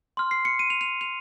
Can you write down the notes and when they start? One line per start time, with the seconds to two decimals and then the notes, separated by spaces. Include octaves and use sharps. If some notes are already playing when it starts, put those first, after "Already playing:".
0.17 C6 F6
0.31 C7
0.45 C#7
0.59 D#7
0.70 F7
0.81 F7
1.01 F7